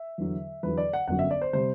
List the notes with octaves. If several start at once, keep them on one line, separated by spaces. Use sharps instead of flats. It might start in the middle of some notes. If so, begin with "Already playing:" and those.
Already playing: E5
E2 D3 F#3
E2 D3 F#3 B4
D5
F#5
G1 F#2 F#3 F#5
E5
D5
C5
C3 G3 C5